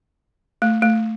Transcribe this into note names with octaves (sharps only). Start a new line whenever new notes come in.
A3
A3